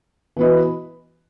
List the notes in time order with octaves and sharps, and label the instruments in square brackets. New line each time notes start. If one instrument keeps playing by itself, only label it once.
[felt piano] E3 B3 F#4 B4 D#5